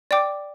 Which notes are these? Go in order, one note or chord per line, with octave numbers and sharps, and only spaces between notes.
D5 G5 D6